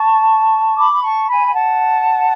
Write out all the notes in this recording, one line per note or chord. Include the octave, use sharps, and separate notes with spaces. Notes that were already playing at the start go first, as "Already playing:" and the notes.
Already playing: A5 C#6
B5 D6
B5
A5 C#6
G#5 B5
G#5
F#5 A5